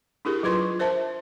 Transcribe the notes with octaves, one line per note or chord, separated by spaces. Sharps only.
D4 E4 G4 G#4 A#4
F#3 F4 B4 C6 C#6
A#4 C5 E5 A5